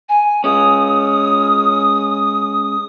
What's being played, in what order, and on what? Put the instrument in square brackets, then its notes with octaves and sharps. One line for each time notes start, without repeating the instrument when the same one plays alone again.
[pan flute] G#5
[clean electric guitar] G#3 C#4 [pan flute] D#6